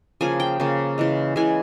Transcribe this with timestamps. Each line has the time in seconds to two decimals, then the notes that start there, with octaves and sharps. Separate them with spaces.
0.21 C#3 F3 A#3 G#5
0.40 G5
0.60 C#3 F3 A#3
0.98 C#3 E3 G#3
1.36 C#3 E3 G#3 G#5